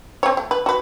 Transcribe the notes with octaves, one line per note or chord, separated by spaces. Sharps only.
C4 C#5
A3
B4
F#4 B4